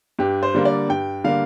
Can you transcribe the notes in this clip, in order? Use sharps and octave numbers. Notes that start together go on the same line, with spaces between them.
G2 G4
C5
D3 G3 A#3
D5
G2 G5
D3 G3 A#3 F5